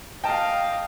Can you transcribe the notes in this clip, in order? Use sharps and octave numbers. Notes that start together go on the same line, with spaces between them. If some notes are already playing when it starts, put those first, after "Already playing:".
D#5 F5 G5 A5